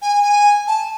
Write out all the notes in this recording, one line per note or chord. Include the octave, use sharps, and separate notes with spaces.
G#5
G#5
A5